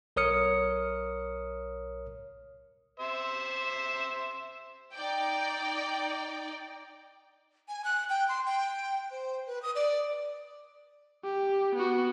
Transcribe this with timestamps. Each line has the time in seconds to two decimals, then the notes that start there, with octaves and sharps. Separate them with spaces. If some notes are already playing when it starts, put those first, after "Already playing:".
0.16 B1 A#4 C#5 D#6 F6 C#7
3.00 C5 E5
4.93 D#4 D5 G5
7.68 G#5
7.85 F#6
8.10 G5
8.29 C6
8.46 G5
9.11 C5
9.47 B4
9.62 D#6
9.75 D5
11.24 G4
11.75 B3 F#4